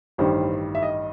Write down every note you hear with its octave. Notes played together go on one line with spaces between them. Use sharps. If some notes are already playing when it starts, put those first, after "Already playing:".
A1 G2 D#3 G3 C5
E5
D#5